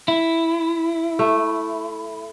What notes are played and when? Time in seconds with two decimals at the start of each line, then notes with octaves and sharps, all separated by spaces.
0.08 E4
1.19 A3